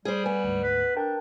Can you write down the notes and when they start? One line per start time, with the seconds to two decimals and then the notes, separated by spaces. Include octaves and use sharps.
0.05 G3 G#4 C5
0.26 B3 G#5
0.44 D2 G#2
0.64 B4
0.97 D4 A#4 G5 A5